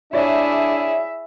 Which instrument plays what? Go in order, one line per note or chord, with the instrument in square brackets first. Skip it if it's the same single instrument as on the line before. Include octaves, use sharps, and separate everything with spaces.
[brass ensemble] D4 [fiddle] E4 G#4 [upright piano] C#5 D5 [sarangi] E5